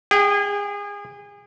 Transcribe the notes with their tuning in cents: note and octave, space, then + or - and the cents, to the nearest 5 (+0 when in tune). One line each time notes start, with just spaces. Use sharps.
G#4 -30 G5 +0